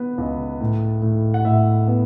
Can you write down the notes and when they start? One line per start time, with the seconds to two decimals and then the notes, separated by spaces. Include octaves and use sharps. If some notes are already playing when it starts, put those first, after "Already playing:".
Already playing: B3 B4
0.18 C#2
0.60 A2
1.02 A2
1.34 F#5
1.45 A2 E5
1.87 B3